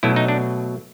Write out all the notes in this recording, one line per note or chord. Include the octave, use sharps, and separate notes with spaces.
B2 F#3 A3 E4
D#4
D4